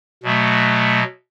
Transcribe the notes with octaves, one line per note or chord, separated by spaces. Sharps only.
B2 F#3 A3